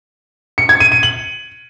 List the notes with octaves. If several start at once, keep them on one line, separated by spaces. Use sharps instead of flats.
C#7
G#6
D#7
D#7
F#7